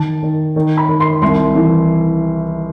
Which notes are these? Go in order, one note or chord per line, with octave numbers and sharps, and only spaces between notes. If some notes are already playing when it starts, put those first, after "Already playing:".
Already playing: D#3 A5
D#3
D#3
B5
D#3
C6
C2 C6
E3